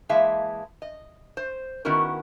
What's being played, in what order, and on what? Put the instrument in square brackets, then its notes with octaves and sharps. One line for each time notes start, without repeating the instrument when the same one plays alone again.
[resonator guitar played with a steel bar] E3 G#3 A#3 E5 F5 A5
D#5
C5
D#3 B3 C#4 E4 F#4 A#4